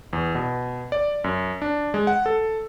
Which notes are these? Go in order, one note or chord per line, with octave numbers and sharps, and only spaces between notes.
E2
B2
D5
F#2
D4
G#3
F#5
A4